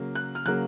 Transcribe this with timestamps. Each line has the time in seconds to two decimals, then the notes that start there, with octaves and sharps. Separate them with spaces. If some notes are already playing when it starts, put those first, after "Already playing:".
Already playing: C#3 F#3 A#3
0.15 F#6
0.35 F6
0.46 C#3 F#3 A#3 F#6